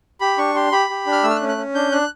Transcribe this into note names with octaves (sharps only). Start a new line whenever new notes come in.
G4 B5
D4 C#6
G4 C6
G4 B5
G4
D4
F6
A3 E6
F6
F#6
C#4
F#6
C#4
D4 G6
D4 F#6